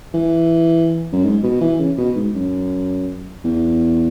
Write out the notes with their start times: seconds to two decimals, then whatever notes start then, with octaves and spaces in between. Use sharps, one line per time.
0.14 E3
1.13 F#2
1.24 G#2
1.43 B2
1.61 E3
1.79 C#3
1.97 B2
2.16 G#2
2.35 F#2
3.44 E2